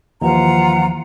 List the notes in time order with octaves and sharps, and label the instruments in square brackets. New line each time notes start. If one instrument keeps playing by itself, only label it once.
[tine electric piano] D#2 E3 F3 [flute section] F4 F#5 A#5